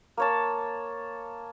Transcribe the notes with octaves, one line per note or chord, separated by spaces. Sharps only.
A#3 C#5 A5